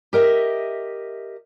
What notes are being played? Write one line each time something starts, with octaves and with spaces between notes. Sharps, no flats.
G4 A#4 D#5 E5